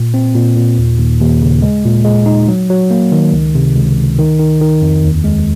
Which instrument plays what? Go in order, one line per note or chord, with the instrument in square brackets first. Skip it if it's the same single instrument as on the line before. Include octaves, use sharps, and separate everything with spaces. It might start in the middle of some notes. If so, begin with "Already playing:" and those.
Already playing: [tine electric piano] A#2
C4
A#2
A#2
D#2
D#2
D#2
C#3
G#3
A#2
G#3
D#4
F#3
F#3
A#3
D#3
C#2
C3
C#2
C#2
D#3
D#3
D#3
F2
D#2
G#3